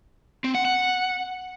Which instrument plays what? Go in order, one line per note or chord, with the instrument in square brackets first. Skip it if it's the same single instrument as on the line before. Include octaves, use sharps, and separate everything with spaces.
[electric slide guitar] C4
F#5
F#5